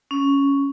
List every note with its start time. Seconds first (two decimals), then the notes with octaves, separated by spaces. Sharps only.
0.11 C#4